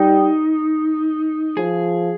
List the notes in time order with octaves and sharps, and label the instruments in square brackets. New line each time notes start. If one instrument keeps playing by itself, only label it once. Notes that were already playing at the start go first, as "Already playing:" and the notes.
Already playing: [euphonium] G3 [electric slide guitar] D#4
[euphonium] F3 [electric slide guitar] G#4